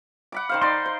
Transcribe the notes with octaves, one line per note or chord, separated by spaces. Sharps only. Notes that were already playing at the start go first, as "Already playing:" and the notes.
F#5 B5 D6
D#3 C5 F5
D#4 D5 C6
C5